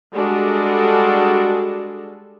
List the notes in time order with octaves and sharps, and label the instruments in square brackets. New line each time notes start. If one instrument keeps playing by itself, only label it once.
[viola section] G3 G#3 D4 F#4 G#4 A4